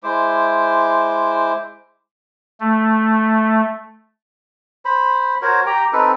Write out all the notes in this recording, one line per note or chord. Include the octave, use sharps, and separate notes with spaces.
G#3 E4 C5 D6
A3
C5 B5
F#4 A#4 C5 C#5
G4 G5 A#5
C4 D#4 A4 B4